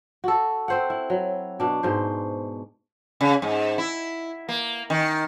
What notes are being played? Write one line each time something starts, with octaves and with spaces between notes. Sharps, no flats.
F#4 A4
C4 C5 F#5
E4
F#3
B2 D4
G#2 B2 C5
C#3
G#2
E4
A#3
D#3